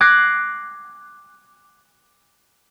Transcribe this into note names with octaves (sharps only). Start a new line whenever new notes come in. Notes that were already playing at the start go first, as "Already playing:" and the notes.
D6 F#6 G#6 A#6 C7